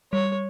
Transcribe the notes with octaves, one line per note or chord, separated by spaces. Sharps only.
G3 C#5